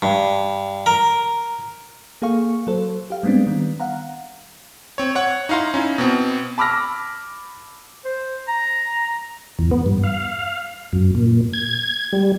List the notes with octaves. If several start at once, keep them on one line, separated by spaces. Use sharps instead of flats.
G2
A#4
A#3 G#4 A4 F5 C#6
F#3 A4 C5
G4 F5
G3 G#3 B3 C4 D4
D#3 G3 B3
F5 F#5 A#5
C4 C#5
C#5 F#5 C#6
D#4 E4 F5 A#5 C6
C#4 D#4 E4
B2 B3 C4
A5 B5 D6 E6 F6 A#6
C5
A#5
E2
B3
G2
F5
F#2
A#2
G#6
G3